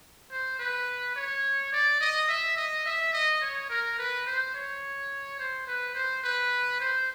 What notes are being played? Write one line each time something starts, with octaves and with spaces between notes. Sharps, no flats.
C5
B4
C#5
D5
D#5
E5
D#5
E5
D#5
C#5
A#4
B4
C5
C#5
C5
B4
C5
B4
C5